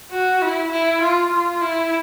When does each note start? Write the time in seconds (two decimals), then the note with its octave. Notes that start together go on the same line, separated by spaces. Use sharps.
0.11 F#4
0.42 E4
0.72 E4
1.01 F4
1.32 F4
1.61 E4